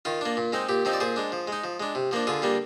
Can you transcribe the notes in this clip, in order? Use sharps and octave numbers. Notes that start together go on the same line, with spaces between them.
D#3 F4
A#3 D4
A#2
G#3 C4 D#4
A#2 G4
F3 C4 D#4
D5
A#2 G#4 C5
G#3 D4
F3
G#3 D#4
F3
G#3 D4
C3
F3 A#3 D4
D3 F4 G#4
G3 A#3 D4